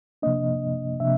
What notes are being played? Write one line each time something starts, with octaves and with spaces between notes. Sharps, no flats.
C3 F3 A#3 D4 D#5
C3 F3 A#3 D4 E5